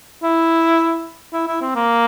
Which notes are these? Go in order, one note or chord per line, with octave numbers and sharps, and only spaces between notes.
E4
E4
E4
C4
A#3